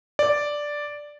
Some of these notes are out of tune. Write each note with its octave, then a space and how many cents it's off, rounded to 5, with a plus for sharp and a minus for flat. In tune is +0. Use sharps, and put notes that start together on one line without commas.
D5 +0